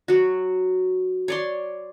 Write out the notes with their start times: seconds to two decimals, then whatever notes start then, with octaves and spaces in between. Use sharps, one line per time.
0.08 F#3 F#4
1.28 C#5 D5 C6